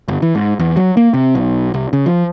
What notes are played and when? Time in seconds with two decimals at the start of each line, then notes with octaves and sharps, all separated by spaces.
0.08 G1
0.22 E3
0.35 G#2
0.59 E2
0.77 F#3
0.97 A#3
1.14 C3
1.35 B1
1.74 C2
1.93 C#3
2.06 F3